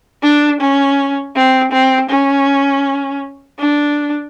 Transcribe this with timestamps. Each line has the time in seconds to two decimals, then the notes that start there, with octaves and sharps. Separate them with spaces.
0.23 D4
0.61 C#4
1.35 C4
1.72 C4
2.10 C#4
3.59 D4